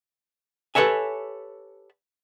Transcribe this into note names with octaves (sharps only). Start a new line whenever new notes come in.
G4 A4 B4 C#5 E5 G#5